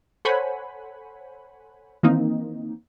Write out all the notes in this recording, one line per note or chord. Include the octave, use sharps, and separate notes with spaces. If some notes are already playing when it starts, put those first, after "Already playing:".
A4 C5 C#5 F#5 G#5 B5
D#3 E3 A#3 C4 D#4